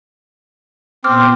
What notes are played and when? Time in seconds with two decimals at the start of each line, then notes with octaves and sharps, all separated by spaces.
1.04 A#2 B3 C4 D6 F6